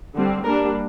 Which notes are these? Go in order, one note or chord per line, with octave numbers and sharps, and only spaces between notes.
D3 G3 C4
G3 A#3 D4 A#4